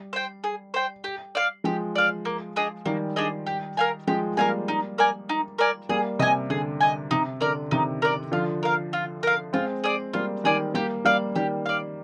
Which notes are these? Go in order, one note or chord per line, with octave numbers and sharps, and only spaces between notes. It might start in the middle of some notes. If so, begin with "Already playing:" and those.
Already playing: G3
C5 G5
G#4
C5 G5
G4
D5 F5
F3 G#3 G4
D5 F5
A#3
D4 G#4 D#5
D#3 G3 A#3
D4 G#4 D#5
G4
A#4 F5 G#5
F3 G#3 G4
G3 A#3 A#4 F5 G#5
D#4
A#4 D5 G#5
D#4
A#4 D5 G#5
G3 A#3 G#4
C3 D#5 G#5
D3 G#4
D#5 G#5
C3 D#4
D3 A#4 D5
C3 D#3 D#4
A#4 D5
D3 F3 F4
A#4 F5
F4
A#4 F5
G#3 C4 F4
G#4 D5
G3 A#3 F4
D#3 G3 G#4 D5
G3 A#3 G4
G3 A#3 D5 F5
D#3 G3 G4
D5 F5